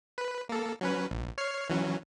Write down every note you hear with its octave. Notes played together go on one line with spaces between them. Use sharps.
B4
A#3 A4
F#3 C#4 B4
A#1
C#5 F6 C7
E3 F#3 C#4